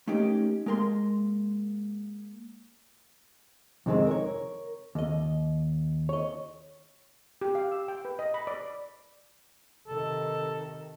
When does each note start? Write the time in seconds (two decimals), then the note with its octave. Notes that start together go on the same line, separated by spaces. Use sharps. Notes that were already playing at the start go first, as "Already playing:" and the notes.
0.08 A3 A#3 C#4 D#4 G4
0.66 G#3 A#3 A#4 G5 C6
3.86 F2 C3 D#3 G#3 C4
4.07 A#4 C#5
4.95 D#2 D#5
6.09 C#5 D#5
7.41 G4
7.55 F5
7.72 E6
7.88 G5
8.05 B4
8.19 D#5
8.34 B5
8.47 D5
9.88 C3 D#3 A4